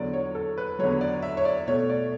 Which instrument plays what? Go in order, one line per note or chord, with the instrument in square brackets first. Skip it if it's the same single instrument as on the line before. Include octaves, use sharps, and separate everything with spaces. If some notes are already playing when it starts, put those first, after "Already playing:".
Already playing: [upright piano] E2 D3 F#3 D5
C#5
A4
B4
E2 D3 F#3 C#5
D5
E5
C#5
D5
B2 A3 C#5
D5